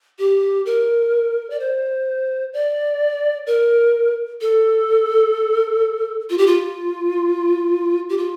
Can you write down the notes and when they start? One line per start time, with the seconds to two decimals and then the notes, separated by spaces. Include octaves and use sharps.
0.19 G4
0.66 A#4
1.50 D5
1.60 C5
2.53 D5
3.47 A#4
4.41 A4
6.30 F4
6.38 G4
6.47 F4
8.09 G4
8.18 F4